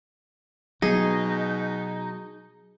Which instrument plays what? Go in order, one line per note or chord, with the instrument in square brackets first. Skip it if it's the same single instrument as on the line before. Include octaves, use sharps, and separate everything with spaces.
[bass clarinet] B2 [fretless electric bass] F#3 B3 [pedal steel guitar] D#4 [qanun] G#4